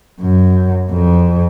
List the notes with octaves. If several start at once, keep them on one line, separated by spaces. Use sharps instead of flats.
F#2
F2